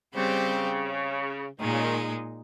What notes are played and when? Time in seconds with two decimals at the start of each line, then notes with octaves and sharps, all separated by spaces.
0.14 C#3 G3 C4 G4 C5
1.60 A#2 D#3 G#3 D#4
1.72 C#3
1.82 D#3